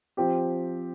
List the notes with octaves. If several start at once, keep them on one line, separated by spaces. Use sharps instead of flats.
F3 C4 G4